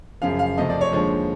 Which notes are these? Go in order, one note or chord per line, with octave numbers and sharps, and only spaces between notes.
F#2 C#3 F3 F5
F5
F2 C3 F3 A3 D#5
D5
C#5
D#2 D3 F3 G#3 C#5